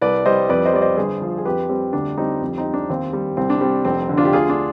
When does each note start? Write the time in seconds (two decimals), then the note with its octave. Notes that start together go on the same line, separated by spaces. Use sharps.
0.01 C2 B4 D5
0.26 G3 C5 D#5
0.49 F2 B4 D5
0.65 C5 D#5
0.73 G3 D5
0.82 C5 D#5
0.97 G1 G#4 C5
1.22 F3
1.38 G#4
1.45 F2 G4 B4
1.69 G3 C4
1.93 D2 D4
2.18 G3 C4 D#4
2.41 F2
2.57 C4 D#4
2.65 G3
2.74 D4
2.90 D#2 C4
3.13 G3
3.37 C2 C4
3.50 D4
3.61 G3 C4
3.85 F1 C4
4.09 D3
4.17 D4 F4
4.25 G4
4.33 D2 F4 G#4
4.49 D4 F4